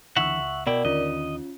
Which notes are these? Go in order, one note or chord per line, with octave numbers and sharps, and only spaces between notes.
C#2 D3 E3 E5 F#5 C#6 E6
C#2
B2 E4 A#4 D5 G5
D#2 D3 D#3 C#4 F4 D#5